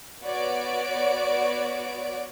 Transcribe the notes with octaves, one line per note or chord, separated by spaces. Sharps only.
B3 F#4 C#5 D5 D7